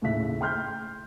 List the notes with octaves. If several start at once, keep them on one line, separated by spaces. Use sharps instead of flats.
D#2 A2 C#3 A3 E5 B6
G5 C6 F6 G6